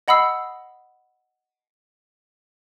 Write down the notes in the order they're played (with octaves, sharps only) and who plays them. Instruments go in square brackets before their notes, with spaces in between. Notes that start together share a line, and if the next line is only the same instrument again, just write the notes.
[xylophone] D#5 F#5 B5 D#6 E6 C7